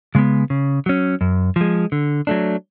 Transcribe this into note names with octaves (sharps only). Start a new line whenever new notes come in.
C#3 G#3 B3
C#3
F#3 C#4
F#2
F3 G#3
D3
F#3 A3 D4